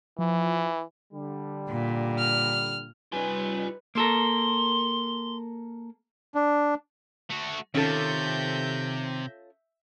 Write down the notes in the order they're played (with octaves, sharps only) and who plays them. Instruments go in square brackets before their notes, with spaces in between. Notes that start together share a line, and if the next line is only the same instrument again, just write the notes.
[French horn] E3 [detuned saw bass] F3
[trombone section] D3 G3
[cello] A#2
[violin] F6
[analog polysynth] G3 C#4 D#4 [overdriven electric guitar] F4 G#5 [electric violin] B4
[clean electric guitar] A#3 A4 A#4 [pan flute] C6
[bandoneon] D4
[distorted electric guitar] A3 F#4
[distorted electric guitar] C3 [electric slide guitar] D#3 [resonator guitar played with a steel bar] C#4 F4 A4 [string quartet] E5 G6 A#6